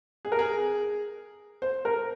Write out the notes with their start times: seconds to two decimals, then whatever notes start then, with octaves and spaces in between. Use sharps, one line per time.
0.25 G#4
0.32 A#4
0.39 G#4
1.62 C5
1.85 A#4